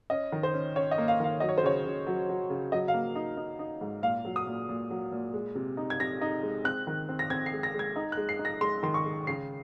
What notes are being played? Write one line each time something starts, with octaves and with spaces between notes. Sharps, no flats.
C#4 D#5
D#3
C5
C#4
C#4 C#5
D#5
A#3
F5
D#3 F5
F#3 D#5
C#5
C5
C#3 C#5
C#3
F#3
F#3
C#3
F#3 D#5
F5
A#3
D#4
D#4
D#4
G#2
A#2 F5
F#3
D#6
A#2
A#2
F#3
A#2
G#3
C3
D#4
G#6
C3 A#6
D#4
G#3
C4 F#6
D#3
C4
A#6
C4 G#6
C7
G#3
A#6
G#3
G#6
D#4
F#6
G#3
C7
D#4
A#6
G#3 C6
D#3 C6
C#6
G#3
C#3 C7